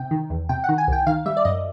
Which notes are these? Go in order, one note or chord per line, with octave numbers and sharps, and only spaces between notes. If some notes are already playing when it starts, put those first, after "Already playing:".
Already playing: C3 G5
D#3
E2
C3 G5
F#5
D#3
G#5
C2 G5
D#3 F5
G3 E5
D5
F#2 D#5